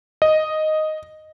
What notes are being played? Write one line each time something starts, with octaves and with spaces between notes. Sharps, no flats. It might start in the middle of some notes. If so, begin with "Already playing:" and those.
D#5